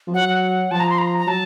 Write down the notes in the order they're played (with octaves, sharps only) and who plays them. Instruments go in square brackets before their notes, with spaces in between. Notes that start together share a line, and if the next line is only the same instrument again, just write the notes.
[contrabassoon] F3
[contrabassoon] F#3 [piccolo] F#5
[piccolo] F#5
[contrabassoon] F3 [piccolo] A5
[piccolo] A#5
C6
A#5
A#5
[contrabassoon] F#3 [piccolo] A5